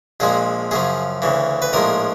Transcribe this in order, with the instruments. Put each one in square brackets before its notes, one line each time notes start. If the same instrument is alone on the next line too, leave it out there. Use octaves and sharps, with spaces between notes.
[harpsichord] A#1 A#2 F3 G#3 G#4
F#2 C#3 F3 G#4
D2 C#3 E3
B4
A#1 A2 F3 G#3 A#4